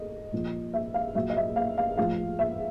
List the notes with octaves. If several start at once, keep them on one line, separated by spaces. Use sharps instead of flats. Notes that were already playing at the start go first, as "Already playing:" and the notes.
Already playing: A4 D#5
A#2 F3
E5
F5
A#2 F#3 E5
D#5
E5
F5
F5
A2 F3 F5
E5